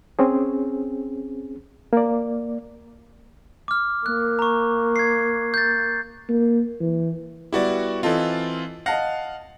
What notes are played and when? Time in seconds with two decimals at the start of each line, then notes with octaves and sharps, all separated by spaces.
0.19 C4 C#4 G#4
1.93 A#3 D5
3.68 D6 F6
4.06 A#3 F#6
4.39 A#5 C#6
4.96 G#6 C7
5.54 G6 A6
6.29 A#3
6.80 E3
7.53 G3 B3 E4 F#4 G4 D5
8.03 E3 C4 F4 A4 D#5
8.86 D#5 F5 F#5 A5 A#6